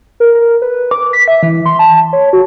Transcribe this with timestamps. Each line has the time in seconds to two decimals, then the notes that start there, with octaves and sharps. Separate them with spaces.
0.20 A#4
0.35 A#4
0.62 B4
0.91 D6
1.13 B6
1.28 E5
1.43 E3
1.66 C6
1.79 A5
2.13 C#5
2.33 F#4